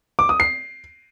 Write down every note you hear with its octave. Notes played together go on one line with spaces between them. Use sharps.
D6
D#6
C7